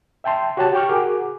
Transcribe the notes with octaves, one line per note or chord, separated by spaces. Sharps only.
E5 G5 A5 C6
F#4 G4 C#5 F#5 A5
G4 G5 C#6 F6
F#4 G#4 A#4 F#5 D6